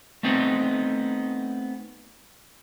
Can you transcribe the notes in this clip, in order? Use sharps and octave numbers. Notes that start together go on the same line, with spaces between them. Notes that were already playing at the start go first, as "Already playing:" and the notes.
A3 B3 C4 D#4